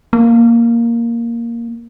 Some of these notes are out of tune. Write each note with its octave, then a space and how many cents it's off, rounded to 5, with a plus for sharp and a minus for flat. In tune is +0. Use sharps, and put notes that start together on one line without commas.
A#3 +0